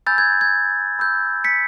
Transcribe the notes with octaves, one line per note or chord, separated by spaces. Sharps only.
G#5 B5 E6 G6 A6
G#6
G#6
B5 E6 G6
B6 C#7